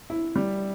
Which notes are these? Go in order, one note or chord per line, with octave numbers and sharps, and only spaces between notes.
E4
G3